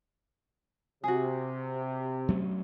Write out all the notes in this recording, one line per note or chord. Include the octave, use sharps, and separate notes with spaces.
C3 F#4 G#4
F#3 A3 C#4